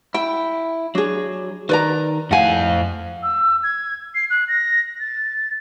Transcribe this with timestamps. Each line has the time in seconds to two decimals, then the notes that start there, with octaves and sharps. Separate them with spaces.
0.14 E4 G5
0.95 F#3 D4 G#4
1.69 D#3 B4 D5 A#5
2.31 F2 A2 F5 F#5 G#5
3.23 E6
3.63 G#6
4.15 C7
4.30 F#6
4.48 A#6
5.00 A6